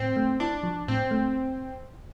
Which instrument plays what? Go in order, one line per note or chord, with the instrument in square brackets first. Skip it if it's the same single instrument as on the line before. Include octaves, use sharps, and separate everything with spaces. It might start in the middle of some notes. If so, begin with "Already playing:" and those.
Already playing: [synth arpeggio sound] A2 [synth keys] C4
[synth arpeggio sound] A3
[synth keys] D4 [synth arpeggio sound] E4
[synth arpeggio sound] F3
[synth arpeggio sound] A2 [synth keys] C4
[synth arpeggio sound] A3